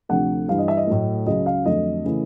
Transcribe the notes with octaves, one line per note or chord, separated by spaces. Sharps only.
D2 C3 F3 A3 F#5
G2 E3 G3 F5
D#5
E5
D#5
A2 F#3 A3
C#2 C#3 F#3 D#5
F5
F2 D3 F#3 A3 D#5
C#3 E3 A3